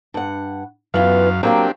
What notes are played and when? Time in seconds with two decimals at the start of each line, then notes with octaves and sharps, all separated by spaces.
0.14 G2 F#5
0.94 F#2 E3 B3 F4 F5
1.43 F#3 A#3 C4 D4 G4 G5